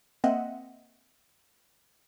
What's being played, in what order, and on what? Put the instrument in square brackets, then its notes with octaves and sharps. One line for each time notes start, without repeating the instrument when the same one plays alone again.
[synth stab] A#3 C4 D#5 E5 F#5